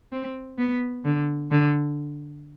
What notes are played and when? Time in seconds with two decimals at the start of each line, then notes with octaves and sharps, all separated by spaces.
0.12 C4
0.58 B3
1.05 D3
1.51 D3